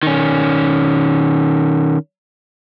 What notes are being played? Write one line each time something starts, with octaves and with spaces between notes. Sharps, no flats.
D#3 C#4